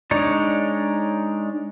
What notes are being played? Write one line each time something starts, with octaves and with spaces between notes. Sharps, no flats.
G#3 D4 D#4 C#5 D5